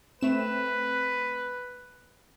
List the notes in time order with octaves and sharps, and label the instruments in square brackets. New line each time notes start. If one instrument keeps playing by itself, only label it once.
[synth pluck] A3 C4 E7 [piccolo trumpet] B4